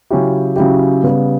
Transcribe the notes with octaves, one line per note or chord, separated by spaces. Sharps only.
C#3 F#3 C#4 E4 G4
C#3 F#3 C#4 E4 G4
C#3 G3 B3